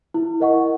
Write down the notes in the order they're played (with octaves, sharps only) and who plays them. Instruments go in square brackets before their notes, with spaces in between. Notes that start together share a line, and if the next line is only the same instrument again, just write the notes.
[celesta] E4
A#4 D#5 F#5 C#6